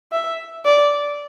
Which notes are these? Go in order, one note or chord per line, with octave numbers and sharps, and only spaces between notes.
E5
D5